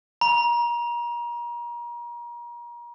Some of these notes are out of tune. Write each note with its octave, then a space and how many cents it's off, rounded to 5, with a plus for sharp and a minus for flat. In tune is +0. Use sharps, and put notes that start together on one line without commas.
A#5 +35